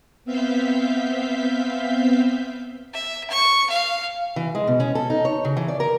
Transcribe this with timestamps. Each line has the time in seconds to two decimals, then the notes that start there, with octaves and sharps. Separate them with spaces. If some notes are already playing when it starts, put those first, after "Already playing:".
0.25 B3 C4 E5 F5 G6 B6
2.93 E5
3.30 C#6
3.70 F5
4.36 E3
4.55 G#3
4.67 B2
4.80 C#4
4.95 A4
5.10 D#4
5.25 C#5
5.45 C#3
5.57 E3
5.68 D5
5.80 A#4